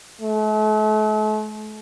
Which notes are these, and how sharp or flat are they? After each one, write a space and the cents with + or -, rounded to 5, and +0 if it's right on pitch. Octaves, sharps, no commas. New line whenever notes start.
A3 -40